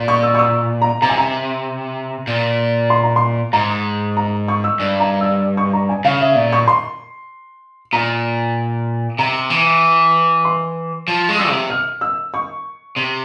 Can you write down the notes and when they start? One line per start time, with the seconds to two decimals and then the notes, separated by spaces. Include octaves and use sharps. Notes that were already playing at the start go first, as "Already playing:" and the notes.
Already playing: A#2
0.08 C#6
0.23 E6
0.35 C#6
0.39 E6
0.82 A#5
1.02 C3 A#5
1.10 G#5
1.18 A#5
2.27 A#2
2.90 C6
3.03 A#5
3.16 C6
3.53 G#2 A#5
4.17 A#5
4.48 C#6
4.64 E6
4.80 G2
5.00 A#5
5.21 E6
5.57 C#6
5.73 A#5
5.89 G#5
6.05 C#3 F5
6.21 E5
6.36 A#2
6.52 C#6
6.68 C6
7.93 A#2 A#5
9.18 C3 A#5
9.50 E3
10.45 C6
11.08 F3
11.29 G#3
11.39 E6
11.49 C3
11.70 F6
12.01 E6
12.34 C#6
12.96 C3